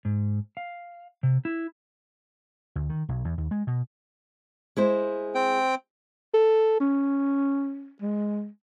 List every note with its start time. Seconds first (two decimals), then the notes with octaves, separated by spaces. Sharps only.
0.05 G#2
0.57 F5
1.23 C3
1.45 E4
2.75 D2
2.89 D#3
3.09 B1
3.24 E2
3.38 D#2
3.51 G#3
3.67 B2
4.77 G#3 E4 C5
5.35 C4 G5
6.34 A4
6.80 C#4
8.02 G#3